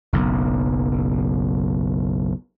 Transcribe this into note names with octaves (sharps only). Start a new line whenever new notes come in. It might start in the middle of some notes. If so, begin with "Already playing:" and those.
F#1 B1